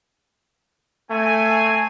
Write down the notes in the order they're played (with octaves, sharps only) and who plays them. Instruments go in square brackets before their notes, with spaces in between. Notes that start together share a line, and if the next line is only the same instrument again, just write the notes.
[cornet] A3 [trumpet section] C4 G#5